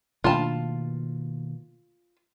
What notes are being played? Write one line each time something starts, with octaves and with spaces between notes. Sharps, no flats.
B2 D#3 A3 A#3 D4 F4 A5